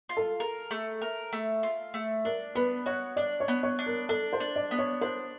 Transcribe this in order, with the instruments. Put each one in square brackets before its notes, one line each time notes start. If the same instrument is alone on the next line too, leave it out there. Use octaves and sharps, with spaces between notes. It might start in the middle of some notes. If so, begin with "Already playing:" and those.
[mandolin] F4
[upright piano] A4
[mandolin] A#4
A3
A#4
A3
F4
A3
[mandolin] D4 [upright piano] A#4
[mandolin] B3 [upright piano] B4
[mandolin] F#4 [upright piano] C#5
[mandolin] D4 [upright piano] D5
[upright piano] C#5
[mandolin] B3
[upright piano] C#5
[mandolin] D4
[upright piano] A#4
[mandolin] D4 [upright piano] A4
[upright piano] C5
[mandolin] D4
[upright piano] D5
[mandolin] B3
[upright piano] C#5
[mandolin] D4 [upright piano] C5